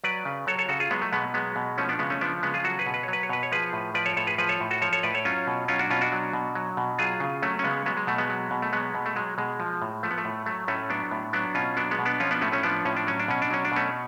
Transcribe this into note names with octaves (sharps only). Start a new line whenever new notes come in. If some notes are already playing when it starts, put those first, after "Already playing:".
F#3 B4 D5
C#3
F#3 A4 C#5
A4 C#5
C#3 F#4 A4
F4 G#4
F#3 G#3 B3
A3
B2 G#3 B3
F#3 G#3 B3
B2
F3 A3 C#4
B3 D4
C#3 G#3 B3
A3 C#4
F3 B3 D4
C#3 G#3 B3
F4 G#4
F#3 F#4 A4
G#4 B4
B2
B4
C#5
F#3 B4
C#5
B2 B4
C#5
F3 G#4 B4
A2
F3 B4 D5
A4 C#5
A2 A4 C#5
G#4 B4
F3 G#4 B4
A4 C#5
A2
F#4 A4
F3 A4 C#5
A4 C#5
A2 B4 D5
A4 C#5
F#3 C#4 F4
B2
F#3 C#4 F4
D4 F#4
B2 C#4 F4
D4 F#4
F#3
B2
F#3
B2
F#3 F4 G#4
C#3
F#3 A3 C#4
C#4
C#3 G#3 B3
F#3 G#3 B3
G#3
B2 A3
G#3 B3
F#3
B2
A3
F#3 G#3 B3
B2
A3
F#3 G#3
B2 G#3
F3
A2
F3 A3
B3
A3
A2
F#3 A3
A2 A3 C#4
F#3 B3 D4
A2
F#3 B3 D4
B2 C#4 F4
F#3 B3 D4
G#3 B3
B2
B3 D4
F3 C#4 F4
B3 D4
A2 A3 C#4
A3 C#4
F3 B3 D4
A2 C#4
D4
F#3 C#4
D4
B2 C#4
D4
F#3 C#4
D4
B2 A3 C#4